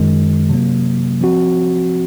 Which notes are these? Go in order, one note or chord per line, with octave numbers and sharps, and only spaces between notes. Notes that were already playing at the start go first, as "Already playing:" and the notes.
Already playing: F#2 D#3 G#3
C3 F#3 A#3
F3 C4 F#4